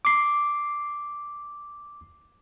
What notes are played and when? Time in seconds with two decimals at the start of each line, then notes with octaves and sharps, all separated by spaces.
0.05 D6 C7